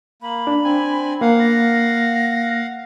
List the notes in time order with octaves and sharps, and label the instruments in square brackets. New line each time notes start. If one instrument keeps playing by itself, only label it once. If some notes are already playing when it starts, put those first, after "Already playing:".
[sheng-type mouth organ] A#3 [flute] B5
[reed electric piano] D4
[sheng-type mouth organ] C4 G#5
[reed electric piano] A#3 [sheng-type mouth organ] F5 F#5
[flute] A#6